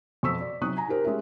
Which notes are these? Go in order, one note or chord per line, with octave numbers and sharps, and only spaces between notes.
F2 B2 C#6 D#6 E6 B6
D5
C3 F#3 D#4 C#6 D#6 F#6
G#5 A#5
D#4 G4 A#4 C5
G#3 C#4 G4 E5